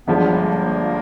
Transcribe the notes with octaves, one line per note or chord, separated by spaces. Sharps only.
G1 G2 D3 F3 G#3 B3
A#3
A#3